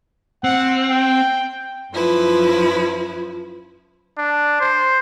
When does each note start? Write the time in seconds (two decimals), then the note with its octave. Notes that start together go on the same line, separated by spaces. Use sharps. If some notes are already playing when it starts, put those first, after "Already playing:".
0.44 C4 F#5
0.90 G5
1.92 F#2 F3 E4 B4
4.18 D4
4.60 C5